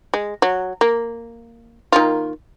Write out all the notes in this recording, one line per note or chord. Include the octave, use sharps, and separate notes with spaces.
G#3
F#3
A#3
D#3 A#3 F4